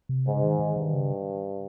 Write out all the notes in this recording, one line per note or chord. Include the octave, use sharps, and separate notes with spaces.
C3
G#2 C#3
D#3
D#3
G2 D#3
C#3